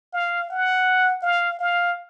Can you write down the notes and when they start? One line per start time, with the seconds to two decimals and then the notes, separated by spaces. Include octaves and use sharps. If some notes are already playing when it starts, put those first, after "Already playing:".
0.13 F5
0.50 F#5
1.22 F5
1.59 F5